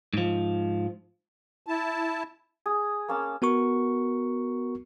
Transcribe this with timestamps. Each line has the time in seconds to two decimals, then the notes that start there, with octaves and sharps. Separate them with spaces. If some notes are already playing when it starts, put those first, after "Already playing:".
0.14 G#2 F3
1.66 E4 A5
2.66 G#4
3.08 A#3 C#4 A5
3.42 B3 F#4 A#4 C#6